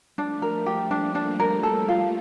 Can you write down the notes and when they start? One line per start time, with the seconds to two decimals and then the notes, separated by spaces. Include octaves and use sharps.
0.18 F3 A3 D4
0.42 A#4
0.66 G4
0.91 G3 A#3 D4
1.15 D4
1.40 A#4
1.63 A4
1.88 F4